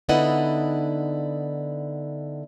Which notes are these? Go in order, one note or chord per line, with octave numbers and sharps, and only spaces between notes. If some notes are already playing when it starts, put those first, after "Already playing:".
D3 B3 D#4 E4 D#5 F#5